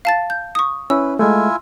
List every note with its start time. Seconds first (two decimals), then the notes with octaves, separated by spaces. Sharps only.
0.05 F5 A5 A6
0.30 G6
0.55 C#6 D#6
0.90 C#4 E4 B4 E6
1.19 G#3 A3 E4 F4 G#5